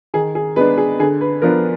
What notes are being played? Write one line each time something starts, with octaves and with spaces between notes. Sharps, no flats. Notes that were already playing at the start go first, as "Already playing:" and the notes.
D#3 G#4
G#4
G#3 B3 D4 B4
G#4
D3 G#4
B4
F3 B3 D4 F4 A#4